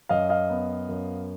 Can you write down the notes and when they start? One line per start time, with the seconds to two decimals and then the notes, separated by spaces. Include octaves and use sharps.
0.09 F#2 D#5 F5
0.29 D#5 F5
0.50 B3
0.89 F#2